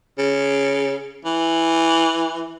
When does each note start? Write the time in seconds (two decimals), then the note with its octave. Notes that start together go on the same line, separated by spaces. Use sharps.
0.18 C#3
1.25 E3